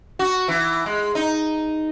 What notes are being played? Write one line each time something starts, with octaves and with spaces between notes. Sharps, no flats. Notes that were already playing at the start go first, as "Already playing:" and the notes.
F#4
E3
G#3
D#4